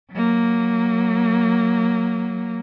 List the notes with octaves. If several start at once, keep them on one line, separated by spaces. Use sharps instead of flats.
F#3 A#3